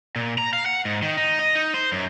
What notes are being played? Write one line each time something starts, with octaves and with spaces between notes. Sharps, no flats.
A#2
A#5
F5
F#5
G#2
D#3
D#4
D#5
D#4
C5
F#2